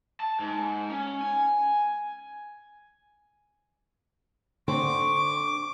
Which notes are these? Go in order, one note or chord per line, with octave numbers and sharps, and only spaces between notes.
A5
G#2
C#4
G#5
D3 C4 C#6 D6